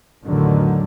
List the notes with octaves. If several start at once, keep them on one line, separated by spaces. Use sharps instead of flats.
A1 E2 D3 D#3 F#3